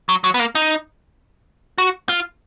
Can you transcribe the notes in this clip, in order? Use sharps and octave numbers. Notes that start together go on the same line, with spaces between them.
F#3
F#3
B3
A#3
D#4
F#4
F4